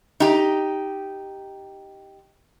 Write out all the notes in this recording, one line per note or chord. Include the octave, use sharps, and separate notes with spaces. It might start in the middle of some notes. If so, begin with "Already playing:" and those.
D#4 G4